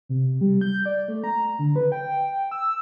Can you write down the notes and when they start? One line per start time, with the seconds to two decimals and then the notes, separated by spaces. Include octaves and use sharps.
0.09 C3
0.41 G3
0.61 G6
0.86 D5
1.08 A3
1.24 A#5
1.59 D3
1.76 B4
1.92 G5
2.51 E6